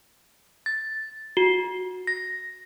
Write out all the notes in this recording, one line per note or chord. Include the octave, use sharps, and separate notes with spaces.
A6
F#4
A#6